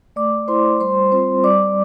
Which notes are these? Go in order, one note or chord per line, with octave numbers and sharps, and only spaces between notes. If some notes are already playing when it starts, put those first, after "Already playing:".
A3 D5 D6
E4 C5 C6
G3 C5 C6
C4 F4 C5 C6
G3 D5 D6